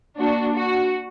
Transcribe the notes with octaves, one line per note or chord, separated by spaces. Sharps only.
A#3 D4 F#4
F#4